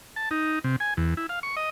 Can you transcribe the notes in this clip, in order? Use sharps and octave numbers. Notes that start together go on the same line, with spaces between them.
A5
D#4
C3
G#5
E2
E4
F5
C#6
D#5